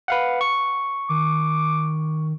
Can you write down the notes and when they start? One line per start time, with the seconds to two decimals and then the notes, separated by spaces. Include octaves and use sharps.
0.08 B4 F5 F#5
0.41 C#6
1.09 D#3 D6